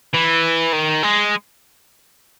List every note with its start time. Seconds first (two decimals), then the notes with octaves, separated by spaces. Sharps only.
0.14 E3
0.73 D#3
1.03 G#3